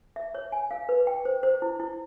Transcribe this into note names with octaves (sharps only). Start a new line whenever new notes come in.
E5
C#5
G#5
F5
B4
G5
C5
C5
E4
E4